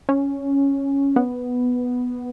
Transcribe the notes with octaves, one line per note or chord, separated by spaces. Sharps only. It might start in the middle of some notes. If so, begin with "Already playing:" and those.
C#4
B3